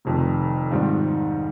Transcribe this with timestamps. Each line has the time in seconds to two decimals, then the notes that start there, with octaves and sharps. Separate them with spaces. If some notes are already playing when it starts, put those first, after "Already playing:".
0.05 F1 F2 C3 D#3
0.71 G#2 D#3 G3 C4 F4